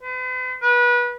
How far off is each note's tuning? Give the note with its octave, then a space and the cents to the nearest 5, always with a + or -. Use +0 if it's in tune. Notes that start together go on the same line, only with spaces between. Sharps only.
B4 +45
B4 -30